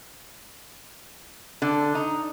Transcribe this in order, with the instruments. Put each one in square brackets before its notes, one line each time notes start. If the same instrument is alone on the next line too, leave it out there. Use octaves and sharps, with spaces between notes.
[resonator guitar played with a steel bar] D3
D#4